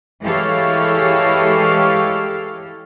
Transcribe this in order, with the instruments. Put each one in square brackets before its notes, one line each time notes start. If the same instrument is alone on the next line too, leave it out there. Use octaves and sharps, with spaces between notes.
[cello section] E3 G#3 G4 A4 C#5 F5